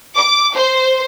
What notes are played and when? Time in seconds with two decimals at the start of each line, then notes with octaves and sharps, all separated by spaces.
0.16 D6
0.55 C5